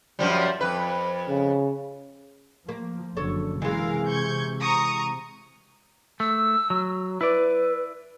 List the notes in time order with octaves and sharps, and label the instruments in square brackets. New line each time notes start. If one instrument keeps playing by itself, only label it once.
[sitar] F#2 F3 G3
F2 B4
[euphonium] C#3
[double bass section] F3 [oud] A#3
[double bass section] F#1 D3 [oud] A4 C#5
[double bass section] C3 [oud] E3 G#3 [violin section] A#4 F5
[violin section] C#6 G6 G#6
A#5 C#6 D#6
[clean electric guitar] A3 [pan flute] E6
[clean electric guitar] F#3
[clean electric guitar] E4 D5 [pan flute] B4